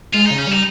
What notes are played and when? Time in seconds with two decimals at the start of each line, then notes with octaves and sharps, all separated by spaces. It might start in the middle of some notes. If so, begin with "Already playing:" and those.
0.14 G#3 F4
0.26 C#3 D#4
0.38 C#4
0.47 G3 D#4